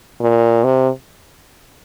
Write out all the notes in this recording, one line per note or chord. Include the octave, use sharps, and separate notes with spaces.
A#2
C3